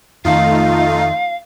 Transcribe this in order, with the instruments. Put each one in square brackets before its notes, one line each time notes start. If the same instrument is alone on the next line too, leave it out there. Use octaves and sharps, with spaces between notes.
[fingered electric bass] F2 D#3 [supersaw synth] A3 D#4 F4 [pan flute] F5